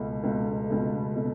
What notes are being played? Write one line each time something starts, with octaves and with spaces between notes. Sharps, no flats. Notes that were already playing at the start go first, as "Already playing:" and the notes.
Already playing: C#2 B2 A3
C#2 B2 A3
C#2 B2 A3
B2 A3